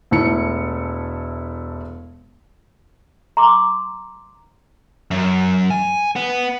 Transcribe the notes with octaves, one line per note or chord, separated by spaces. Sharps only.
E1 A3 E4 C#7
A#5 C6 D6
F#2
G#5
B3